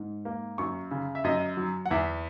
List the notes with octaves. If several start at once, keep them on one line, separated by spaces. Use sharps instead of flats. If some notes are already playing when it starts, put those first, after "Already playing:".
Already playing: G#2
A#3
F#2 C#6
C#3
E5
F#2 D#5
F#3
F#5
E2 E5